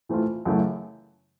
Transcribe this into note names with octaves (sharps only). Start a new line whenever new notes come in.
E3 A3 C4 F4
F#2 C#3 E3 A3